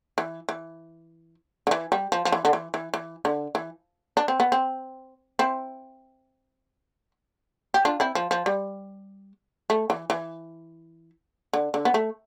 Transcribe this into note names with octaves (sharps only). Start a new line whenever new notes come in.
E3
E3
D3
E3
G3
F3
F3
E3
D3
E3
E3
E3
D3
E3
D4
C4
B3
C4
C4 E4
G4
D4 F4
C4 E4
F3
F3
G3
A3
E3
E3
D3
D3
B3
A3